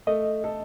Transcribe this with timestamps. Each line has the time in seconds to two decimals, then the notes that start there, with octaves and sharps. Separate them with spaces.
0.07 A3 D#5
0.44 A4